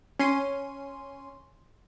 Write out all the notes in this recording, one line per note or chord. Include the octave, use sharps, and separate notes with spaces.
C#4 C6 D#7